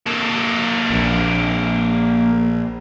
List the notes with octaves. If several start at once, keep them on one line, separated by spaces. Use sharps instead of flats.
A#3 A4
A#1